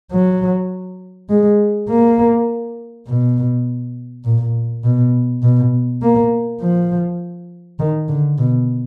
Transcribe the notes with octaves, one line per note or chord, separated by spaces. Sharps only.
F#3
G#3
A#3
B2
A#2
B2
B2
A#3
F3
D#3
D3
B2